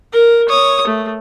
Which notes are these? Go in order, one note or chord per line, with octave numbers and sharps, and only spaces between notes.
A#4
C#5 D#6
A3